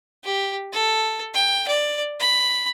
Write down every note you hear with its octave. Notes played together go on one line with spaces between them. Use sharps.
G4
A4
G5
D5
B5